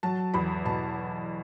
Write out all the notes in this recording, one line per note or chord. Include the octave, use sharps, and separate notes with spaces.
F#3 A5
E2 B5
B2 A5